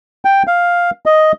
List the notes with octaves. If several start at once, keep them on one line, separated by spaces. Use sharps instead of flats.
G5
F5
D#5